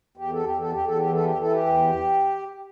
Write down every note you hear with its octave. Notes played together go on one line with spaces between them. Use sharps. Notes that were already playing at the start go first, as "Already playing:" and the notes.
E2 G4
A4
E2 G4
A4
G4
E2
A4
G4
E3
A4
G4
E3 A4
G4
E2